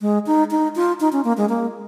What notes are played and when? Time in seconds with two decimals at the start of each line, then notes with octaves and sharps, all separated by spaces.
0.01 G#3
0.26 D#4
0.51 D#4
0.76 F4
1.00 D#4
1.12 C#4
1.24 A#3
1.37 G#3
1.49 A#3